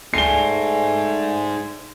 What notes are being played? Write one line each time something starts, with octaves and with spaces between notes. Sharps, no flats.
A3 D#4 G#4 D5 G#5 C7 G7